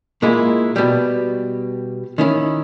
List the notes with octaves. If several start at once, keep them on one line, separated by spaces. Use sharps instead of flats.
A#2 G#3 A#3 E4 F4
B2 G3
D#3 C#4 E4